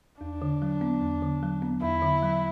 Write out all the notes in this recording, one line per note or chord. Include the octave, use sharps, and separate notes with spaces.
E2 D4
D3
F#3
B3
E2
D3
F#3
B3
E2 E4
D3
F#3